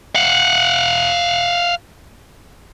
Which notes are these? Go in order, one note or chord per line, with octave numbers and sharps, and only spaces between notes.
F5 F#5